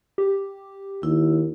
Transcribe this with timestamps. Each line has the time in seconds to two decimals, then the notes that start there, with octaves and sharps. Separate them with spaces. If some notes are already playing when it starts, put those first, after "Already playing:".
0.18 G4
1.03 D#2 E4